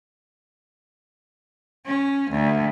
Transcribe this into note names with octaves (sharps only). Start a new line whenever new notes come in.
C#4
D2